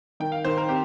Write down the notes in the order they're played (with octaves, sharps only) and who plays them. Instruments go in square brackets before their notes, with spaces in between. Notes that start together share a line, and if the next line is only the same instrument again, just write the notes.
[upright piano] D#3 [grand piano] G5
[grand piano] F5
[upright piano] D#3 [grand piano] C5
[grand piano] A#4
[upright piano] C4 [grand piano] G4